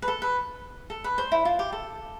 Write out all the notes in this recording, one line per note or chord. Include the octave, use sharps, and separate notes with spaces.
B4
A4
B4
A4
B4
C5
E4
F4
G4
A4